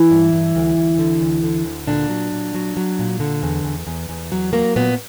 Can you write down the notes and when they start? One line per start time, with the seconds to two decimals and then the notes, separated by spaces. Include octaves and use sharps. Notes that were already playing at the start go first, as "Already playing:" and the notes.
Already playing: E3 E4
0.11 G2
0.33 G2
0.55 D2
0.77 D2
0.99 D3
1.21 D2
1.44 D3
1.65 D2
1.87 A#2 D3 D4
2.09 F#3
2.32 A#2
2.54 F#3
2.77 F#3
2.99 A#2
3.20 D3
3.43 E2
3.64 E2
3.87 E2
4.09 E2
4.32 F#3
4.53 F#3 A#3
4.76 A#2 B3